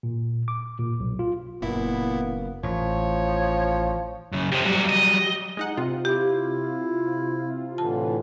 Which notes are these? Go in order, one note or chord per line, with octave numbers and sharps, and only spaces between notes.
A#2
D6
A#2
B1
F4
F#1 A#2 A#3 B3 E4
A1 F3 C#5
F#2 C#3
F2 D#3 G4 C5
E2 F#3 G3 F#4
D#5
G#3 D#4 F#5
C3 F4
E4 G4 D6
A2 D3 E3 A5